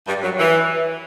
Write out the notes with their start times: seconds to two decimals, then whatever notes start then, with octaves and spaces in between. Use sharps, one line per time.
0.07 G2 G3
0.23 F#2 F#3
0.38 E3